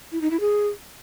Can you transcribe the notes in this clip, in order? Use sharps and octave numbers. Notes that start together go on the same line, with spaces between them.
E4
D#4
E4
G#4